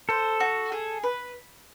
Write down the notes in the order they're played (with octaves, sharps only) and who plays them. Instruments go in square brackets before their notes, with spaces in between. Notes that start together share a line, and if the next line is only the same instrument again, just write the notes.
[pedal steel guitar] A4 [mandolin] C5
[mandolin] F#4
G#4
B4